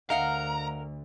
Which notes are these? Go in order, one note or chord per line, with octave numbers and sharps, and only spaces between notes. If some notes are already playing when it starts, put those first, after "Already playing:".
D2 A#4 D#5 F5 F#5 A#5